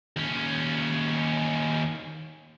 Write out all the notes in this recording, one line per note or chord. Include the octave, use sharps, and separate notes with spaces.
D#2 C#4